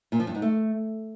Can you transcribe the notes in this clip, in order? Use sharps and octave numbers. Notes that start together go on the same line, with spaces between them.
A#2
F3
G2
G#2
A3